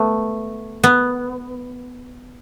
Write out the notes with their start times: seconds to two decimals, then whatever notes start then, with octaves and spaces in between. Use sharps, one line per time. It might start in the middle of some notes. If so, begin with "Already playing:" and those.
Already playing: A3 B3
0.84 B3